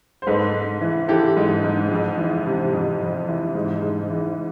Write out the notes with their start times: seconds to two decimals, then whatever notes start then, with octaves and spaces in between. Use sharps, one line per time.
0.22 C5
0.27 G#2 A4 B4
0.54 G#2
0.81 E3
1.08 E3 G4 A4
1.37 G#2
1.64 G#2
1.91 F2
2.18 E3
2.46 C3
2.73 F2
3.00 F2
3.28 E3
3.55 G#2
3.82 G#2
4.10 E3